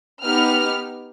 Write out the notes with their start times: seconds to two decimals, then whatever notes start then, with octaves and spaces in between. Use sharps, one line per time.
0.23 B3 D#4 G4 F6